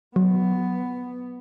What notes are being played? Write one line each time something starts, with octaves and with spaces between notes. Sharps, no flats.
F#3 B3